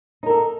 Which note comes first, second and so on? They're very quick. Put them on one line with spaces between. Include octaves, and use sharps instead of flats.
D#4 A#4 A4